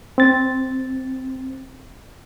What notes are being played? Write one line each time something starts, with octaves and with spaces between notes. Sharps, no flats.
C4 A6